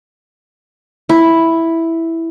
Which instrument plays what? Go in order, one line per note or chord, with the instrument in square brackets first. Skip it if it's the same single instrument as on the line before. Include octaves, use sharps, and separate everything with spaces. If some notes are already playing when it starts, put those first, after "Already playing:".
[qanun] E4